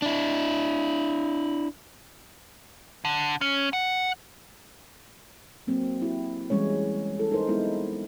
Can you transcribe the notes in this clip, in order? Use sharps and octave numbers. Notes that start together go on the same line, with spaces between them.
D4 E4
D3
C#4
F#5
F#3 A#3 C4
E4 F#4 G4
E3 G3 G#3 C#4 C#5
E4 A4
D#4 G#4 A#4 C5
F#3 G#3 B3 C4 D#4 E4